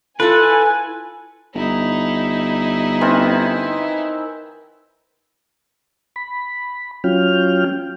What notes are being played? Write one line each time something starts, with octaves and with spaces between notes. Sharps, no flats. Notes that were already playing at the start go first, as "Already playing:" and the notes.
E4 F4 A4 B4 G#5
G1 D#4 E4
D#3 E3 C4
B5
F#3 C#4 F4 G5 F6